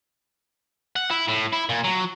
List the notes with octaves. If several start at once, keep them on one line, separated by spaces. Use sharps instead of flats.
F#5
E4
A2
E4
A#2
F#3